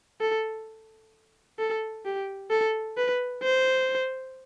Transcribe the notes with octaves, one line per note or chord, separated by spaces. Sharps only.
A4
A4
G4
A4
B4
C5